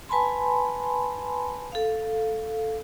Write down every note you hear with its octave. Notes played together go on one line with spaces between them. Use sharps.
B4 G#5 A5 B5 C6
A4 F5